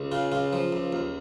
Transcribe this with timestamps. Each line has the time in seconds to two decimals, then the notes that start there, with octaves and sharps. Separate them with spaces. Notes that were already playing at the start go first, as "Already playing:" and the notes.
Already playing: C#2
0.12 C#3 F4
0.32 C#2 F4
0.53 F3
0.72 C#2
0.93 D#2